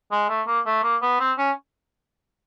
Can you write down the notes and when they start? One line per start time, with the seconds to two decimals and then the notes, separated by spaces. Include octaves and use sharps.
0.12 G#3
0.29 A3
0.47 A#3
0.66 A3
0.83 A#3
1.02 B3
1.20 C4
1.38 C#4